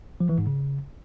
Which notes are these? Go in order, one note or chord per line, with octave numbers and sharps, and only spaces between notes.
F3
E3
G#2
C#3